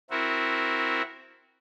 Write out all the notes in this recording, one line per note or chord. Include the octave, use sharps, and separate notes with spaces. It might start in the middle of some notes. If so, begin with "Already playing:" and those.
C4 E4 F#4 A#4